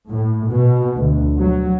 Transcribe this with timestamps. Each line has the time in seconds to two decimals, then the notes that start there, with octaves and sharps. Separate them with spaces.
0.10 A2
0.51 B2
0.97 D2
1.38 F#3